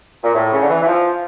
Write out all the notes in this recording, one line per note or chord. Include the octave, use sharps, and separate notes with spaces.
A#2
A2
C#3
D3
E3
E3
F3